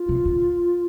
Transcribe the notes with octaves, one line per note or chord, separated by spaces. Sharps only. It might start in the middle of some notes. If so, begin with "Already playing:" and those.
Already playing: F4
C3
D3